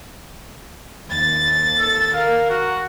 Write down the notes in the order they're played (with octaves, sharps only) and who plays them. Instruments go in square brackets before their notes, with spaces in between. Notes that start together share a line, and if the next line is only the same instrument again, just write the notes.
[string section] D#2 A6
[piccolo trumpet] A4
[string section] A#4 [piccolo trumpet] F5
[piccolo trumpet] F#4